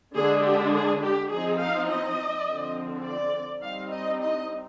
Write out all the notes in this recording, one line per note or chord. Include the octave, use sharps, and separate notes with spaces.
D3 G#3 D4 G#4
G4
G#4
G4
F3 C4 D#4 G#4
F5
D#5
D3 F3 C4
D5
G3 C4 D#4 F5
D#5
D#5